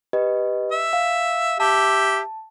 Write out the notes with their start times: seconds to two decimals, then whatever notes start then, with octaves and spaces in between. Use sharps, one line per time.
0.13 G4 B4 D#5
0.72 E5
0.93 F5
1.60 G4 E5 A5